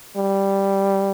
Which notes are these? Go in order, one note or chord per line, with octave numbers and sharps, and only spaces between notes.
G3